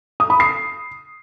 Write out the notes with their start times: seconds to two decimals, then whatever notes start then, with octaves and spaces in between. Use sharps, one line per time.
0.20 D#6
0.30 B5
0.40 C7